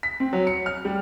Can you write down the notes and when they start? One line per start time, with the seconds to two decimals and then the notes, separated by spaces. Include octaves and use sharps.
0.03 B6
0.20 C4
0.33 F#3
0.47 C#7
0.66 F6
0.85 G3